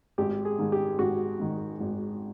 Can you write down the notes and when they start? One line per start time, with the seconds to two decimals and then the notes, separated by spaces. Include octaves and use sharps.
0.18 G#1 G4
0.45 G#4
0.58 G#2 D#3
0.72 G4
0.99 G#1 F#4
1.39 G#2 D#3
1.80 G#1